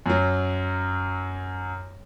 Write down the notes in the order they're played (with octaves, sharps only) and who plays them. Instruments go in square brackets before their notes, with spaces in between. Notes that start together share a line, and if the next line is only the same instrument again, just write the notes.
[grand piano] F#2 F#3